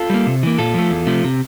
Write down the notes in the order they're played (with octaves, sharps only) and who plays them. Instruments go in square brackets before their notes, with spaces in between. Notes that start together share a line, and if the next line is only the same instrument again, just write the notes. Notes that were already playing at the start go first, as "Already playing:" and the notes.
Already playing: [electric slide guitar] F4 A4
G3 A#3
C3
E3 A#3
A#2 F4 A4
F3 A3
E2
C3 F3 A3
C3